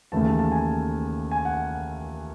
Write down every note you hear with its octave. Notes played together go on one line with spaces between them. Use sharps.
D#2 C#3 E3 A3 A5
A5
A5
G#5
G#5
F#5